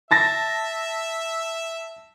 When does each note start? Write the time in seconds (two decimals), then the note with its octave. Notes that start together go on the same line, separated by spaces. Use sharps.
0.11 E5 A5 A6 A#6